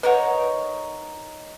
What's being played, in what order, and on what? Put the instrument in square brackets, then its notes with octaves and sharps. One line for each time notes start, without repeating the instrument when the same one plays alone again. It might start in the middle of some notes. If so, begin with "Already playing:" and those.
[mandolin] D#4 A#4 C#5 [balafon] B4 F#5